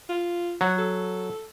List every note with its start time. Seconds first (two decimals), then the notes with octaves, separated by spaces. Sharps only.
0.09 F4
0.61 F#3 F#4
0.78 A4